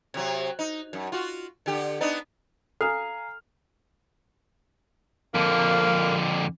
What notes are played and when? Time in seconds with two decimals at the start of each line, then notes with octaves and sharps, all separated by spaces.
0.14 C3 F#3
0.59 D#4
0.93 F#2
1.12 F4 F#4
1.66 D3 G4
2.01 B3 D4 D#4
2.81 A4 F5 G#5 A#5 F6 C7
5.34 F2 D3 A#3